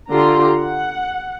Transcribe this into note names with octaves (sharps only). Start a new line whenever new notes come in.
D3 F4 G4 A#5 C6
F#5